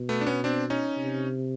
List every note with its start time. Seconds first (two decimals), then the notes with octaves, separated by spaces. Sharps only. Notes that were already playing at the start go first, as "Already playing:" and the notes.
Already playing: B2
0.09 A3 B3
0.21 D4
0.26 B3 C#4
0.44 C4 D4
0.70 C#4 D#4
0.97 C3